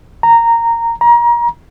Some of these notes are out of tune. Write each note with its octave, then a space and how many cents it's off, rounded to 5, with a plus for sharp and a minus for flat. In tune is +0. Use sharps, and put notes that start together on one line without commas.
A#5 -10
A#5 +30